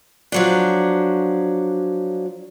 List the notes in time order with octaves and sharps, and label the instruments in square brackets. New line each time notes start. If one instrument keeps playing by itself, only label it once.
[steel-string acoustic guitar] F3 F#3 D4